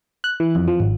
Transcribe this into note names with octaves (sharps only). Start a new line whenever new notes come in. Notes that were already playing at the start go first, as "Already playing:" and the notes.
F#6
E3
F2
F3
G#1